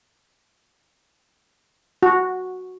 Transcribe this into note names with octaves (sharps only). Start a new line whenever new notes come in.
F#4